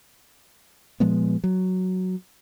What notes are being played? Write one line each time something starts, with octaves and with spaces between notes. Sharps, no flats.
A#2 F3 G#3 B3
F#3